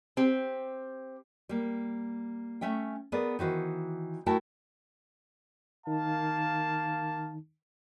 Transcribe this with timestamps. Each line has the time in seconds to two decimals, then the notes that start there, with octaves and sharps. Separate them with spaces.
0.17 C4 G4
1.49 G3 A#3
2.61 A3 C#4 E5 G5
3.12 B3 G#4 A#4 B4 D5
3.39 D#3 E3 F#4 C5
4.26 A3 E4 F#4 A#4 G5 A5
5.87 D#3 A#3 D#4 F5 A5